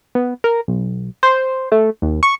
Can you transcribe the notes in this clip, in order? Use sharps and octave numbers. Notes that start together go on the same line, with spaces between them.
B3
A#4
B1
C5
A3
D#2
C#6